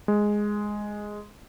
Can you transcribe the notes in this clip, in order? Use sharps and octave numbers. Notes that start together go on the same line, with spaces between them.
G#3